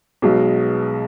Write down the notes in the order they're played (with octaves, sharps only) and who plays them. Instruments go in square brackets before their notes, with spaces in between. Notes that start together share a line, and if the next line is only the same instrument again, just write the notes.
[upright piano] B1 B2 G#3